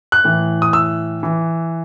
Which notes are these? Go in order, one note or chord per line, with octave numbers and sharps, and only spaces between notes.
F#6
A2 E3
D#6
E6
E3